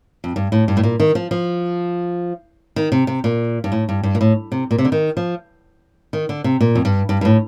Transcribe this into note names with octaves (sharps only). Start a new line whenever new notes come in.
F2
G2
A2
G2
A2
A#2
D#3
F3
F3
D#3
C3
C3
A#2
G2
A2
G2
G2
A#2
A2
C3
A#2
C3
D3
D#3
F3
D#3
D3
C3
A#2
F2
G2
G2
G2
A2